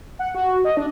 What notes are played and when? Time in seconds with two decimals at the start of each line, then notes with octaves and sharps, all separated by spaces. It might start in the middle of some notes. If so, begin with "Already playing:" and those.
0.19 F#5
0.35 F#4
0.65 D#5
0.77 D4